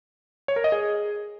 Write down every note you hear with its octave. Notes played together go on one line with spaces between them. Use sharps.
C#5
A#4
D#5
G#4